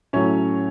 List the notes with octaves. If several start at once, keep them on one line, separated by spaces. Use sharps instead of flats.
A2 F#3 A3 C#4 C#5